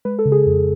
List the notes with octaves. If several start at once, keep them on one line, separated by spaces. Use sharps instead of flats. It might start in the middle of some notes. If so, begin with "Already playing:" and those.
G#3 B4
A4
C#3
G#4
F2